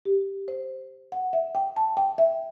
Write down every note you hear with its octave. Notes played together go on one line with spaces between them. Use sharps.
G4
C5
F#5
E5
G5
A5
G5
E5